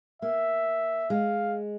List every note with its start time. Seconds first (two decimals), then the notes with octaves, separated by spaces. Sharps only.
0.22 A#3 E5
1.10 G#3 F5